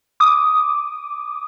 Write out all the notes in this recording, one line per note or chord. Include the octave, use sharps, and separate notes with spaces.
D6 D#6